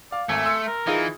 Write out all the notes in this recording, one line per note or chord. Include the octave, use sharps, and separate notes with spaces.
D5 F5
G#1 A3 G#5
C6 E6 C#7
A#4
E3 D#4 F4 G#4